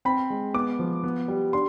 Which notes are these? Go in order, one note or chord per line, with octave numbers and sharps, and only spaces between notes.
C4 B5
G#3
B3 D6
F3
B3
G3
D4 C6